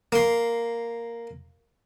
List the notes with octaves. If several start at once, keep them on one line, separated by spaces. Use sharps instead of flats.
A#3 C6